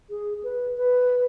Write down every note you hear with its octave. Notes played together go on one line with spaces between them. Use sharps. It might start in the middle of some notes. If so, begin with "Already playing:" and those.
G#4
B4
B4